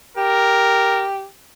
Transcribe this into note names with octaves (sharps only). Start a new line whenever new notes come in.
G4 A#4